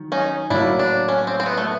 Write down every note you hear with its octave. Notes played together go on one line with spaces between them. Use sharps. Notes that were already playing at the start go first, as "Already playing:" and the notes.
Already playing: D#3 F#3
C#4 D#4
A2 F#3 A#3 D4 E4
D4
C#4
C4
C4
B3
A3